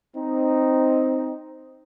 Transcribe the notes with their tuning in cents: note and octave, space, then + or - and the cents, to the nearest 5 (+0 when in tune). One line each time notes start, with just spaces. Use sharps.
C4 +0 D#4 +0